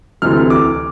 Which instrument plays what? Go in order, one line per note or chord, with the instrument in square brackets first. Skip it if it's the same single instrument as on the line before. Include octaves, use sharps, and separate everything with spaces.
[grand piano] D2 C3 E3 F6
D6